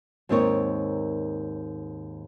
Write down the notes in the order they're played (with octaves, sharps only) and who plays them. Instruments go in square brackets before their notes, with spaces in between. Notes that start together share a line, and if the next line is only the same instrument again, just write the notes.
[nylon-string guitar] D#2 G#2 C4 D#4 A#4 C#5